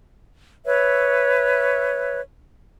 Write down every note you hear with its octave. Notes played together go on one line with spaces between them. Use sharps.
B4 C#5 E5